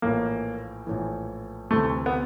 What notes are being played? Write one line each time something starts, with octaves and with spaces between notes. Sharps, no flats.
A#1 A2 E3 A#3
A#1 A2 E3
D2 C3 E3 A3
B3